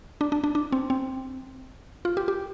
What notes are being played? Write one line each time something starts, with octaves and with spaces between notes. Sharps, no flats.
D4
D4
D4
D4
C4
C4
F4
G4
G4